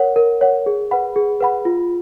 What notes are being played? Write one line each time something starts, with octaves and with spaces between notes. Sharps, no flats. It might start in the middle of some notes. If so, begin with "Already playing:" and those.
Already playing: A#4 C#5 F#5
A#4
C#5 F#5
G#4
B4 F#5 B5
G#4
B4 F#5 B5
F4